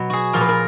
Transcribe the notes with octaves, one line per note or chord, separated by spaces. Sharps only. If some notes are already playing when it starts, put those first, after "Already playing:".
Already playing: B2 F#3
F#4 G#4
A#2 F3 A#4
B4
A#4